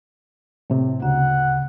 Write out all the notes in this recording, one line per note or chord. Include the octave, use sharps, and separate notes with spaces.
A2 C3
D2 C#3 F#5